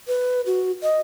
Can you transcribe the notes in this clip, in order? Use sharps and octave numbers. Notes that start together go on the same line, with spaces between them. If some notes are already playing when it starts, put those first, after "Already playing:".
B4
F#4
D#5